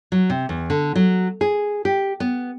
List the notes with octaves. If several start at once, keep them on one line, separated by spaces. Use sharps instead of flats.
F#3
C3
E2
D3
F#3
G#4
G4
B3